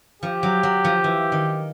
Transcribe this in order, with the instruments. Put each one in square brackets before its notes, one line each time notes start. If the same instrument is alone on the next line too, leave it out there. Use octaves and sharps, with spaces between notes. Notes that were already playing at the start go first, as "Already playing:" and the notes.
[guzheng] F3 [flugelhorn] G4
[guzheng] F#3
F#3
F3
E3
D#3